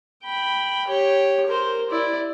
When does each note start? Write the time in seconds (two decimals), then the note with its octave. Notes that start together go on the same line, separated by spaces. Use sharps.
0.24 G5 B5
0.87 G4 C#5
1.47 A#4 C5
1.91 E4 D5